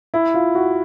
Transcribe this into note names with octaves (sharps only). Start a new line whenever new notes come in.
E4
F4
F#4